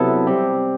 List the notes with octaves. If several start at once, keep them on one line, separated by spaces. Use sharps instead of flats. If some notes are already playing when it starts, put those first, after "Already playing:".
Already playing: C3 F#3 B3 E4 A4
G3 C4 G4